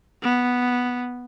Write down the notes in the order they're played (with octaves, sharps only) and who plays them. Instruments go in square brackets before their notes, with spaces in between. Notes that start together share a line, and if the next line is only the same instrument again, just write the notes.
[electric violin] B3